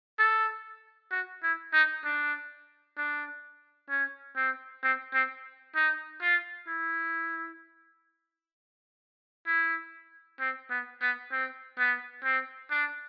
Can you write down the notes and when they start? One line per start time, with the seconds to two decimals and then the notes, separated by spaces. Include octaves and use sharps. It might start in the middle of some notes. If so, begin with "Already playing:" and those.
0.19 A4
1.11 F#4
1.43 E4
1.73 D#4
2.05 D4
2.98 D4
3.90 C#4
4.37 C4
4.83 C4
5.13 C4
5.76 D#4
6.22 F4
6.68 E4
9.47 E4
10.40 C4
10.70 B3
11.02 B3
11.32 C4
11.79 B3
12.24 C4
12.71 D4